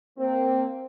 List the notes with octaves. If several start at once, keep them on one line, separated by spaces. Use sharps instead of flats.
A#3 C4